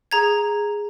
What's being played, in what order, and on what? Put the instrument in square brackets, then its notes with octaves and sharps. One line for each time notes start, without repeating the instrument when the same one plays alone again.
[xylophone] G#4 A#5 G#6